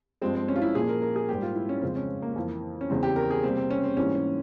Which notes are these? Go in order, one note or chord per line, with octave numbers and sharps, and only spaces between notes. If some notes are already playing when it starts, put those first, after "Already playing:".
G2 F3 G#3 C4
C4
C#4
F4
E4
A#2 F3 A#3 G#4
A#4
A#4
G#4
G#2 G3 A#3 G4
F4
E4
C#4
F2 C#3 F3 G#3 C4
C#4
A#3
F2 E3 A#3
C#4
E2 C#3 E3 C4
G4
A#4
G#4
C3 G3 A#3 C4
C4
C#4
C4
G#2 E3 G3 A#3 C#4
C#4